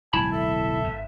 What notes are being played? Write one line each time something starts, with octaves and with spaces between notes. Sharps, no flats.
D1 B1 G#3 E4 G#5 A5 B5
A4 E5
G#1 G#2